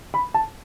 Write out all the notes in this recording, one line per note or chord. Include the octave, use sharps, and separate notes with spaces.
B5
A5